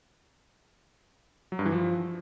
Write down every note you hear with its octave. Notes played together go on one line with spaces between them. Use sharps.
F#3
G2
E3
F3